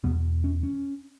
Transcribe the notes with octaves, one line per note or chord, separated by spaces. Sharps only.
E2 B2 B3
C#4
C#4